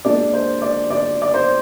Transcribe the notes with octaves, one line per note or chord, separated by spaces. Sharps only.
A#2 G#3 D4 D5
C5
D5
D5
D5
C5